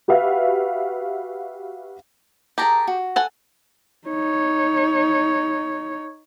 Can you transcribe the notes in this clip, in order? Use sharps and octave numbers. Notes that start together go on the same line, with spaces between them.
F#4 G4 B4 E5 F5
G4 G#4 A#4 A5 A#5
F#4
A4 F#5 G#5
D#4 C#5